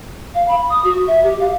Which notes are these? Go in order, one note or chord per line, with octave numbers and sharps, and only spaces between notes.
F5
B5
D#6
F#4
E5
G4
F5